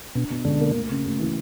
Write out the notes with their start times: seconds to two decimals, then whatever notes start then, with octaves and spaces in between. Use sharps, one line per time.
0.15 B2 D4
0.30 B2
0.44 C#2 D3
0.60 A#3
0.74 D2
0.90 C#3
1.05 D2
1.20 E3